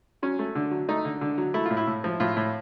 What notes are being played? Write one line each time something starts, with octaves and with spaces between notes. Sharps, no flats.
F#3 C#4
A3
D3
F#3
A3 D#4
D3
D3
F#3
A3 E4
A2 F4
E4
A2
F3
A2 F4
A2